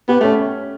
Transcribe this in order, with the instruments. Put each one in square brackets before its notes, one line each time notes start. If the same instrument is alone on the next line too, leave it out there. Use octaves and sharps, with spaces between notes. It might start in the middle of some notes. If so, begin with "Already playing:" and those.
[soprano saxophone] B3 [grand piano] G4
[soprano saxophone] A3 [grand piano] C#4